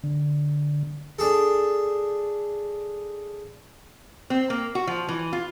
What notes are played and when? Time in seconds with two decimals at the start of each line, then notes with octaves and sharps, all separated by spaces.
0.04 D3
1.19 D4 G#4 A4
4.30 C4
4.50 A#3
4.75 F#4
4.87 F3
5.09 E3
5.33 F4